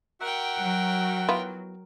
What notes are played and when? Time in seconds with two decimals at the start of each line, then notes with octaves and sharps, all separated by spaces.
0.21 F#4 A#4 E5 F#5 G5
0.59 F#3
1.29 B3 E4 F4